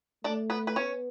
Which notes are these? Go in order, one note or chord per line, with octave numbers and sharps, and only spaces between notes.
A3 D4 D5
B3 B4
B4
B3 C#4 C#5